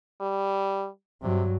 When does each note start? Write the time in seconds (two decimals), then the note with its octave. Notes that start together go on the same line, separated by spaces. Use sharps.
0.21 G3
1.22 G2 C3 F#3